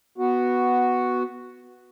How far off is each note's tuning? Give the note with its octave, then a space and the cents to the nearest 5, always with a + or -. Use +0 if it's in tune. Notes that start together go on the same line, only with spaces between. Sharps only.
B3 +0 F#4 +0